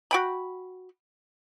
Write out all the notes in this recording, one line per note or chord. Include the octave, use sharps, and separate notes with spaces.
F#4 G5 B5